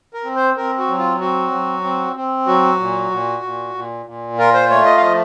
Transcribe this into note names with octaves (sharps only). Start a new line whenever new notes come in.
A#4
C4
C5
C4 A#4
F#4
F#3
F4
C4 F#4
F#3
C4
C4
F#3 F#4
A#2
A#2
A#2
A#2
A#2
F4 A#4
C5
A3 C#5
D#5
F5
F3 D#5